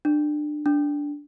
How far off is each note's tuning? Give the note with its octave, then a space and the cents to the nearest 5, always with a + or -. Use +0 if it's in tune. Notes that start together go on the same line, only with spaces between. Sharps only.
D4 +25
D4 -10